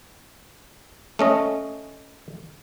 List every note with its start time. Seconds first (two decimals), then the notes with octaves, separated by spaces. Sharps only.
1.19 A3 C#4 D#5